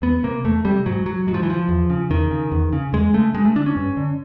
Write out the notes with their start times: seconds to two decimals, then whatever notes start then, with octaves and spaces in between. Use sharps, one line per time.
0.02 E2 B3
0.23 C3 A#3
0.44 E2 A3
0.65 C3 G3
0.86 G#2 F#3
1.06 F#3
1.27 G#2 F#3
1.34 F3
1.43 E3
1.50 F3
1.69 E2
1.90 C#3
2.10 E2 D#3
2.31 C#3
2.52 E2
2.73 C#3
2.93 E2 G#3
3.14 C#3 A3
3.35 G2 G#3
3.45 A3
3.56 D3 D4
3.66 C#4
3.76 G2
3.97 D3